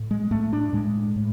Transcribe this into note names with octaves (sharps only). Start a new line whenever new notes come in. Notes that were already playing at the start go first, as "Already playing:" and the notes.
Already playing: A2
G#3
A2 A3
D4
A2 G#3
A2